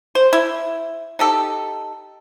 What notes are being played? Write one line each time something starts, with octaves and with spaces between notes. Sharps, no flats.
C5
E4
D#4 G4 A4